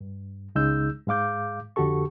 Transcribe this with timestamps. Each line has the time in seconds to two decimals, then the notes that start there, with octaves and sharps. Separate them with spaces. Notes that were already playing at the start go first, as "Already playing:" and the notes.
0.01 G2
0.55 C#2 C#3 G#3 D#4 E6 G6
1.07 G#2 G#3 F5 D6 G6
1.76 F2 D3 F#4 G4 A4 C#6